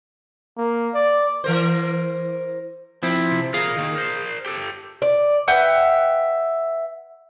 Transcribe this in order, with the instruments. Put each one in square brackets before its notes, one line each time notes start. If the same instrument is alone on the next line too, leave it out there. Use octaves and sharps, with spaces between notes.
[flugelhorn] A#3
D5
[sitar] E3 A#4 C5
[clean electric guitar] F3 C4 E4
[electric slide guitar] C3
[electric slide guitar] F4 A#4 [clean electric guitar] G#4 F5
[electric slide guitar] D#3 A#3
A#4 C5
G4 A4
[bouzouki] D5
[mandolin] B4 E5 F#5 G5